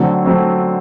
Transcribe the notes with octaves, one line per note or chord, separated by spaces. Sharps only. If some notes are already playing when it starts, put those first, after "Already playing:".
Already playing: D3 F#3 A3 C4
F#3 A3 C4